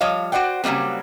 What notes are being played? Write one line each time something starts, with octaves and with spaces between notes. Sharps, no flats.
F3 G3 C#5 D#5 F5
F#4 C5 D5 F#5 G5
C#3 F#3 G3 A#3 C4